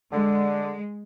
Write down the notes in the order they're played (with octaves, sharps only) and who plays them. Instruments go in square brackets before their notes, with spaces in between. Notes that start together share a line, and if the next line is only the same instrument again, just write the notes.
[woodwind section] D3 [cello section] G#3